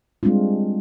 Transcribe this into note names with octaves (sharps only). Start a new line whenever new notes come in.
G3 G#3 C4 D4 F4